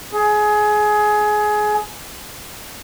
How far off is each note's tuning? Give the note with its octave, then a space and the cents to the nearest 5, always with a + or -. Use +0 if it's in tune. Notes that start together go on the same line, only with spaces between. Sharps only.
G#4 +20